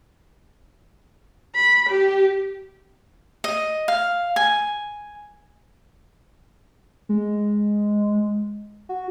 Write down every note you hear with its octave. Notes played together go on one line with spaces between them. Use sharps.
B5
G4
D#5
F5
G#5
G#3
F#4